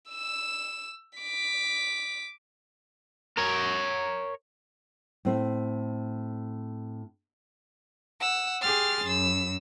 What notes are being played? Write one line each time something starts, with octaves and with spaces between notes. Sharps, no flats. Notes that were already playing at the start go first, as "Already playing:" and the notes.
E6 E7
D6 B6
A#4 C#5
A2 C4
F#5 E6
G4 G#4 C6 F6 A6
F#2 E6